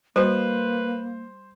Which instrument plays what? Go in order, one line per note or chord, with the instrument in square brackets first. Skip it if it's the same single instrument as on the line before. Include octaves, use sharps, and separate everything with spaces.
[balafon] G3 F#4 [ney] A#3 [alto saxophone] B4 [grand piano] C5